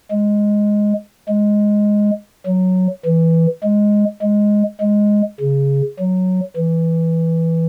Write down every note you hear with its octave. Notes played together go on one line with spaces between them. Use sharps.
G#3
G#3
F#3
E3
G#3
G#3
G#3
C#3
F#3
E3